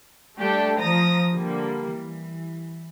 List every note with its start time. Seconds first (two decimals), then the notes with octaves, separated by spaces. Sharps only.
0.38 G3 A3 D4 G4 A4
0.80 F3 A#5 D#6 A#6
1.33 D3 G3 A#3
1.88 E3